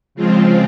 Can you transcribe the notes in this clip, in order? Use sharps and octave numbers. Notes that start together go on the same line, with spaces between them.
C#3 F3 G#3 C4 F4